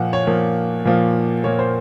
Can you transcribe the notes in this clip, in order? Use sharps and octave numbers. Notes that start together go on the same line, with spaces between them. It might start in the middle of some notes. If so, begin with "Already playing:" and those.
Already playing: A#2 F3 A#3 F#5
C#5
A#2 F3 A#3
A#2 F3 A#3
A#2 F3 A#3 C#5
C5